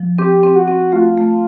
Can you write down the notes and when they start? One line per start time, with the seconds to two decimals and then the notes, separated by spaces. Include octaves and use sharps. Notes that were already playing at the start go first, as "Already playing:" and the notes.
Already playing: F3
0.18 C4 G4
0.43 C4
0.56 F#4
0.68 C4
0.92 A3 F4
1.17 A3